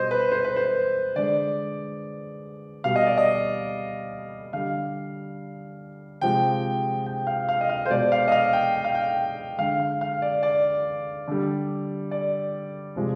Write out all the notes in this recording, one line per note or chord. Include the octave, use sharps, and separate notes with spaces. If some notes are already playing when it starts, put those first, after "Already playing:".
Already playing: B2 G3 C5 D#5
B4
C5
B4
C5
D3 G#3 D5
B2 G3 F5
D#5
D5
D#5
D3 G3 F5
C3 F3 G#3 G5
G5
F5
F5
D#5
F5
C5
B2 G#3 D5
F5
D#5
F5
G5
G5
F5
G5
D3 G#3 F5
F5
F5
D5
D5
D3 G3
D5
C3 F3 G#3